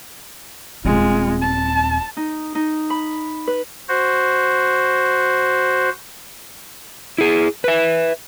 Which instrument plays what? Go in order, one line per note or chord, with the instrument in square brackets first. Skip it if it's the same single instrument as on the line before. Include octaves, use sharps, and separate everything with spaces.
[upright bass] D#1 C4 [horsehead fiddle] G#3 F4
[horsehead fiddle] A5
[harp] D#4
D#4
B5
B4
[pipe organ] F#4 C5
[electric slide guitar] E4 G#4
B4 E5